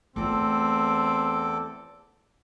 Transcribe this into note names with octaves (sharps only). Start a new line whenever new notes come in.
E2 A3 C4 F4 A4 D6